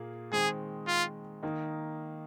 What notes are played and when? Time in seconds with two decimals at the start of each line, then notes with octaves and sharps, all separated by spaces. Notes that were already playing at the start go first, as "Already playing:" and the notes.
Already playing: A#2 A#3 G#4
0.31 D#3 G#3 C4 G#4
0.87 F4
1.43 D#3 A#3 D#4